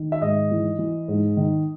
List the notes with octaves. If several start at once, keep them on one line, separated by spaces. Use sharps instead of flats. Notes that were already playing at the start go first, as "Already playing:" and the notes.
Already playing: D#3
E5
G#2 D#5
E3
E3
G#2
D#3